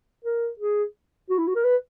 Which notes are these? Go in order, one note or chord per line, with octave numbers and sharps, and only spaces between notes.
A#4
G#4
F#4
E4
F#4
A#4
B4